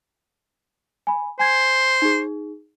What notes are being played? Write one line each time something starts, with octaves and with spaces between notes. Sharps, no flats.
G#5 B5
C5 G#5 G#6
D#4 G#4